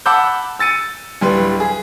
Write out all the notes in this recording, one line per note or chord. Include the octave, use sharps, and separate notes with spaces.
F#5 A5 B5 D6 E6 G6
E6 A6 C#7 D#7
D1 G3 B4 C6
G#4